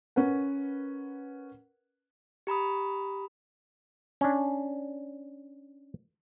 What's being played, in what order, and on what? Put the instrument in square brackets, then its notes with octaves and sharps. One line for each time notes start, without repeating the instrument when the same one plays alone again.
[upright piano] C#4 A#4 B4 F#5
[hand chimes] G4 A#5 B5 D#6
[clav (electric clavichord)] C#4 D4